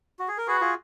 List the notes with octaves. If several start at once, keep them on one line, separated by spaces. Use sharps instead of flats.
F#4
G#4
A#4
F#4 G#4 B4
F4 G#4